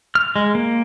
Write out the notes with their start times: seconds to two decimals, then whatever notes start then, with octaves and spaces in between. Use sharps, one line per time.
0.15 F6
0.36 G#3
0.55 A#3